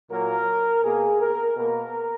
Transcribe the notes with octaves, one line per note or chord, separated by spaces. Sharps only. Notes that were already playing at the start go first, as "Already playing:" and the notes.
A#2 F#3 A#3 A#4
B2 A#3 G#4
A#4
B2 A#3 A#4